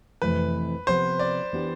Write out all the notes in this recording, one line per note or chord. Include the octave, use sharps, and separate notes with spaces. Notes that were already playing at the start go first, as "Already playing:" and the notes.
F2 C3 E3 A3 B4
C3 F3 B3 C5
D5
E3 B3 D4 G4